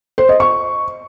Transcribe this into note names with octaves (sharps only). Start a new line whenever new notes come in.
C5
D#5
C#6